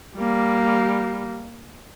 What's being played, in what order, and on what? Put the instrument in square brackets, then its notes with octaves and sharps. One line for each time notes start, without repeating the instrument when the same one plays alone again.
[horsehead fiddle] G3 A#3